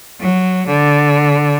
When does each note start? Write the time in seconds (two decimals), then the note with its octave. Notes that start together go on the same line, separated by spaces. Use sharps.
0.20 F#3
0.67 D3